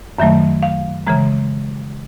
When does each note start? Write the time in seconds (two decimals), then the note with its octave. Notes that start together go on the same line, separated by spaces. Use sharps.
0.18 F#2 D#3 F#3 A3 E5
0.62 F5
1.07 C#3 E3 G#3 A#5